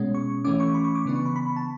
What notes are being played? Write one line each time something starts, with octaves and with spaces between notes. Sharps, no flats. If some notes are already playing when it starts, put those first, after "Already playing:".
Already playing: B2 G#3 C#4
C#6
E3 A3 C#4 D6
C#6
B5
C#6
D6
C#3 E3 B3 D4 C#6
C#6
B5
B5
B5
A5